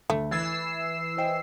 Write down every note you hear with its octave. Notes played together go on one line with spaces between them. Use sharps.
D2 A3
E3 E6 G#6 A6 C7
C5 D#5 G5